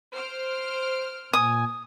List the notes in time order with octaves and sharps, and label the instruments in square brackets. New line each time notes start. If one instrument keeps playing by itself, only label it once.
[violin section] C5 F6 D7
[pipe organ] A#2 G#5 [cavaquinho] D#6